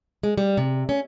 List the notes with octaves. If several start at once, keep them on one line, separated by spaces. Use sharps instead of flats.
G#3
G3
C3
C#4